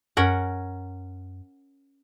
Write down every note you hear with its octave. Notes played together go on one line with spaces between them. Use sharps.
F#2 C#4 A#4 F#5